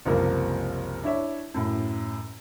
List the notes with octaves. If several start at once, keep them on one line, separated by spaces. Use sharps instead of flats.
F#1 C2 F3 A#3
D4 E4 C#5 E5
F#2 A2